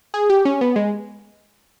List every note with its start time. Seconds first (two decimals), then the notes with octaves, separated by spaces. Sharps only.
0.14 G#4
0.30 G4
0.45 C#4
0.61 B3
0.76 G#3